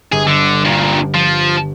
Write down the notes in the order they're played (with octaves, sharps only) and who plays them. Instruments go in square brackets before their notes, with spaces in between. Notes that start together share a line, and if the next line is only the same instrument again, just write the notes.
[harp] G1 [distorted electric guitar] G#4
[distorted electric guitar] D3
G2 A#2
F3